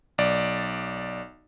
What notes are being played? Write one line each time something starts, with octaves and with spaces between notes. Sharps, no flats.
B1 D5